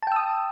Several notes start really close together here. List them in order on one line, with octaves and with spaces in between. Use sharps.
A5 G5 E6 D#6